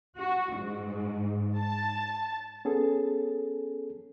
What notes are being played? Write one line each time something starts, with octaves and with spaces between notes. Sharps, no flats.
F#4
G#2
A5
B3 C#4 G#4 A4